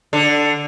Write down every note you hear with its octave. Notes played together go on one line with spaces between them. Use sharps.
D3